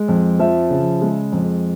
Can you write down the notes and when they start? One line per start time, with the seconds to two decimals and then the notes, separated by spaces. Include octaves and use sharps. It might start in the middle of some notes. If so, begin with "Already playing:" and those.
Already playing: G#3
0.08 F2
0.39 F3 E5
0.70 C#3
1.02 G#3
1.32 F2